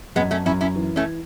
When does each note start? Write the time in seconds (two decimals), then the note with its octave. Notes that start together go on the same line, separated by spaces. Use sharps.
0.16 F#2 G#3 B3
0.31 A3 C#4
0.45 F#2 C#4 E4
0.61 C#4 E4
0.76 E3
0.96 A3 C#4